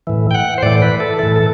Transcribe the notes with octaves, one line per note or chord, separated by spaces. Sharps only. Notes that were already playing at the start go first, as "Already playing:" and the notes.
A2 E3
G5
F#5
C5
A2 E3 D5
B4
A4
A2 E3 A4
A4